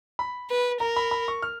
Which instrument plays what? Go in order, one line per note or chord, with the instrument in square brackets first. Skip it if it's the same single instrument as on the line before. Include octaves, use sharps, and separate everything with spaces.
[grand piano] B5
[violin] B4
[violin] A#4 [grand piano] A#5
[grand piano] B5
B5
C#6
F6